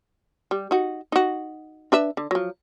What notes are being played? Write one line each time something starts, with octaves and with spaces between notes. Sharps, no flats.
G3
D#4 F#4
D#4 F#4
D4 B4 E5
D3
F3 F#3